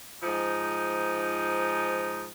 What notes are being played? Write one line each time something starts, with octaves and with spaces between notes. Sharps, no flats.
G#2 F3 D#4